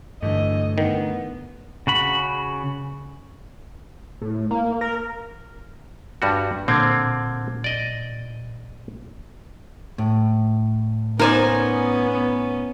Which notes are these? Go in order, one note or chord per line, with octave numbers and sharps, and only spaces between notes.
G2 D3 E3 A3 D#5
D#3 B3
C#3 F#4 B5
A2
A#3
A#4
G2 G3 F#4
A#2 D3 A#3 C4 G#6
D5 D#5
A2
B3 C#4 D#4 A#4 C5 D5 G#5